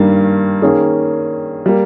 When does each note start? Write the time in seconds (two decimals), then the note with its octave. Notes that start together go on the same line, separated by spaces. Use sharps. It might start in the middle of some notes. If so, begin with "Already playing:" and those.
Already playing: G2 D#3 G3 A#3
0.62 D#3 A#3 C#4 G#4
1.66 G3 A#3